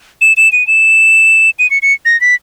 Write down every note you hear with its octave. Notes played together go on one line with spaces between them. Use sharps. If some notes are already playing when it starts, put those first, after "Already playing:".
E7
E7
D#7
E7
D#7
C#7
C#7
A#6
B6